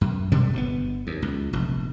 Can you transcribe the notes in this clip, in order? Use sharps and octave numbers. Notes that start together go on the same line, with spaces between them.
F#2
B2 D3 G3 G#3
G1 B2 B3
D#2
C#2
F1 A#1